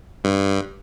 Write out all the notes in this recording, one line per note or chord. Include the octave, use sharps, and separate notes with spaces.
G2